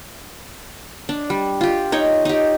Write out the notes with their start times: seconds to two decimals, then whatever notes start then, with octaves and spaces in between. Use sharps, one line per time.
1.09 D4
1.30 G3
1.61 F4 G4
1.92 D#4 C#5 G5
2.25 D#4 G4